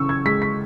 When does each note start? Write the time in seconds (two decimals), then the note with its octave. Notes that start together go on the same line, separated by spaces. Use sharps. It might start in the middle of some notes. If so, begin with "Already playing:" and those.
Already playing: C#3 E3 C#6 E6
0.09 G#6
0.25 G#3 B6
0.42 B6